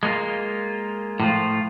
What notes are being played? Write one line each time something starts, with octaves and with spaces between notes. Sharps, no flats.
G#3 A#3 D#4 F4
A2 F3 F4